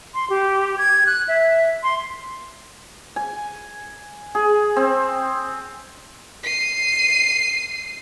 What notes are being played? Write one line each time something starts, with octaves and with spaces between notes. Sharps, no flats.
C6
G4
G#6
F#6
E5
C6
G#5
G#4
C4
C7 D#7